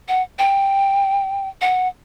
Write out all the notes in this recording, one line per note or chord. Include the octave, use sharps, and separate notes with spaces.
F#5
G5
F#5